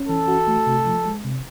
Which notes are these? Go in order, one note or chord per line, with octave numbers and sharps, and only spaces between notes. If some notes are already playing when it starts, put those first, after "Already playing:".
Already playing: C#4
E3 A4
F#4
A3
C3
F3
G#3
C3